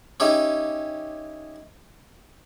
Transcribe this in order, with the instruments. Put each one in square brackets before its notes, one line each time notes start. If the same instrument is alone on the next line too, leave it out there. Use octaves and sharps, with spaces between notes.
[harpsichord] C#4 D#4 E4 G4